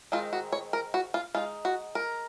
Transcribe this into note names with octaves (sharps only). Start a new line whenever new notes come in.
D#3 G#3 C4 D#4 F4
F#4
C#5
A#4
F#4
F4
G#3 D#4 F4
F#4
A#4